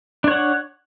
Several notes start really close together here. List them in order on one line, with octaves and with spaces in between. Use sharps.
D4 C#5 F#5